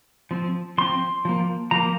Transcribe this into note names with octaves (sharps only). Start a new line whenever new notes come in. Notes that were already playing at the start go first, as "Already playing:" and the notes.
F3 C4
F3 C4 C6
F3 A#3
F3 A#3 A#5